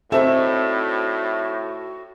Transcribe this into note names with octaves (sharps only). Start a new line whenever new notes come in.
A2 C4 D#4 F#4 A4 C5 D5 E5